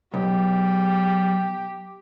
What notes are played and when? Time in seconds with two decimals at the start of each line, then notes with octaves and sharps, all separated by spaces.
0.14 B1 G4